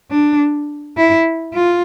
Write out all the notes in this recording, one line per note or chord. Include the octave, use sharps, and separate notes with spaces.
D4
E4
F4